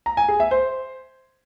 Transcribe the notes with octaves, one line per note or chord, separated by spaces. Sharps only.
A#5
G#5
G#4
E5
C5